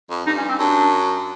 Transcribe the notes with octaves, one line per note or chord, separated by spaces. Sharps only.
F2
G2 D#4
C#4
C4
F#2 D4